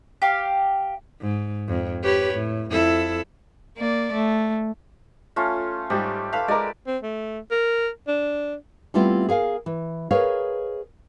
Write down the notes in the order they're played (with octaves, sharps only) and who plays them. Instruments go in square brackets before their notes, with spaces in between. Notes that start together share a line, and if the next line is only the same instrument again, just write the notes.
[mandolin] G4 F5
[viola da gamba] G#2
F2
G4 B4 C#5
A2
F2 E4 A4
A#3 D5
A3
[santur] A3 C#4 F4
[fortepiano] G#2 G3 [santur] G4
[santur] A4 B4 B5 [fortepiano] F5
[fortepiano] G#3 A#4 [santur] D5
[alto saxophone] C4
A3
A#4
D4
[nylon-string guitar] G3 A3 B3 C4 E4 F4
G#4 A#4 F5 G#5
E3
G#4 A#4 B4 C#5 D#5 F5